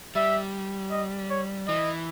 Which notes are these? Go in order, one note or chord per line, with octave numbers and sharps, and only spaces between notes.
G3 E5
D#5
C#5
E3 D#5